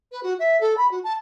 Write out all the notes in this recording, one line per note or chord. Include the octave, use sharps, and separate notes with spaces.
B4
F#4
E5
A4
B5
F#4
A5